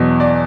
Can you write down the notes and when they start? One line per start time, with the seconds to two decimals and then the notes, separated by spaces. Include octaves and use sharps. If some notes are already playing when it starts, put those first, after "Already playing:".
Already playing: E2 B2 F#3
0.20 D5